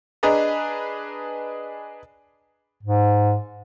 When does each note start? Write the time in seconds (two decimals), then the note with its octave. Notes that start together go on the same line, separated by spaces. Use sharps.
0.23 D4 G#4 B4 D#5 A#5
2.83 G#2